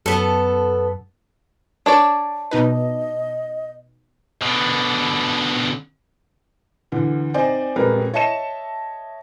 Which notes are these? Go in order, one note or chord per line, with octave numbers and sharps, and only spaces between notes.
F#2 B3 A4
D4 C#5 D5
B2 D#4 B4 D#5
B2 D3
D2 D3 E3
C4 D#4 C5 D5 D#5 G#5
D#1 F2 G3 G#3 A#4 B4
C#5 D#5 E5 A5 C#7 E7